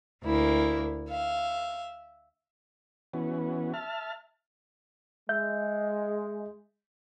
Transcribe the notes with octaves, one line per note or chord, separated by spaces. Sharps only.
D2 A#3 E4
E5 F5
E3 B3 C#4 F#4
E5 A5 F6
G#3 E5 G6